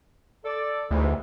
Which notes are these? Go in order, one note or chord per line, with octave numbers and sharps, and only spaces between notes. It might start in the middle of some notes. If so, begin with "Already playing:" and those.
A4 D5
D2 G#2 C3 E3